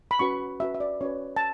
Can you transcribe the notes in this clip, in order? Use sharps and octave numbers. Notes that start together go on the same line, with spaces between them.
B5
C#4 F#4 B4 C#6
C#4 F#4 B4 E5
E5
D5
C#4 F#4 B4 C#5
A5